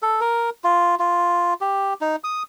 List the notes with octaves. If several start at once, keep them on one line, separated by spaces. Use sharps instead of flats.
A4
A#4
F4
F4
G4
D#4
D#6